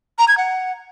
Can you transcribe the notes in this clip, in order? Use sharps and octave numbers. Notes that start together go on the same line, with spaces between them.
A#5
G#6
F#5